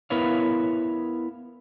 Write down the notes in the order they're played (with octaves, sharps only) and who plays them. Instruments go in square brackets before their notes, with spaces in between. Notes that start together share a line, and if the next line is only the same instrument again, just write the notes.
[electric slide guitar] B3 E4 A#4 B4 C#5 F5